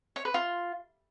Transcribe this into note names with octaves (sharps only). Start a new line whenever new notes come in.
C#5
B4
F4